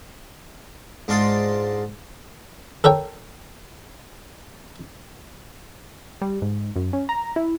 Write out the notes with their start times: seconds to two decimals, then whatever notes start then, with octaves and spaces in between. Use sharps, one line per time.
1.08 G#2 D4 F4 D5 C6 D#6
2.84 A4 A#4 C#5 G5
6.21 G3
6.42 G#2
6.76 F#2
6.93 C#4
7.09 A#5
7.36 E4